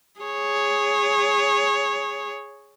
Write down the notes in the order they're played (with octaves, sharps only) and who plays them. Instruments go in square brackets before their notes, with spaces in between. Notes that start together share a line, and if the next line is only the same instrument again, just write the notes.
[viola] G#4 C#5